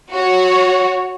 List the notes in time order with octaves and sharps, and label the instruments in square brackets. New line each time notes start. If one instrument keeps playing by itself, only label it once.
[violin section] F#4 C#5